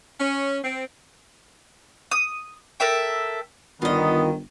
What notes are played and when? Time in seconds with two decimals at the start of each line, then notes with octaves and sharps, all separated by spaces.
0.20 C#4
0.63 C4
2.11 D#6
2.80 A4 A#4 E5 G5
3.82 G1 D#3 B3 F4 D#5